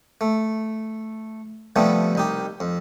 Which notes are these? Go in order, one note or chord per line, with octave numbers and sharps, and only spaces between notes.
A3
C3 F3 G3 A3 B3
C2 D#4 G4
F2